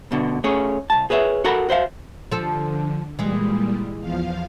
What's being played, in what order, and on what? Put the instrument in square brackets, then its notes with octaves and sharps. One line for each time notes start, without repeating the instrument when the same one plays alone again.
[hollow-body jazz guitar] G2 B2 D3
A3 C#4 G#4 C#5
C2 A5
G#4 B4 C#5 E5
F#4 A4 A#4 F#5 A#5 B5
F#4 C5 E5 F5
[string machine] D3 [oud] F3 A4
[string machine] A#2 G3 [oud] E3 G#3
[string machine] E2 F3 F5